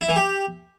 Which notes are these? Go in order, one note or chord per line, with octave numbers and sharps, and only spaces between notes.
E4
E3
G4